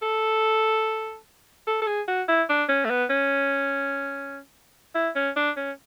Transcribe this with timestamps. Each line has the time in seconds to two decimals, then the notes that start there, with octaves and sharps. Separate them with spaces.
0.02 A4
1.67 A4
1.82 A4
1.87 G#4
2.08 F#4
2.28 E4
2.49 D4
2.69 C#4
2.85 A3
2.90 B3
3.10 C#4
4.95 E4
5.15 C#4
5.36 D4
5.57 C#4